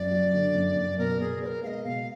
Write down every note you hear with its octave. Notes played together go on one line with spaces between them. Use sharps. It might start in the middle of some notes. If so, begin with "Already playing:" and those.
Already playing: F#2 D5
F#3
D3
F#2
F#2
B2 A#4
B2 G#4
B3 A#4 D5
G#3 D#5 F5
B2 F5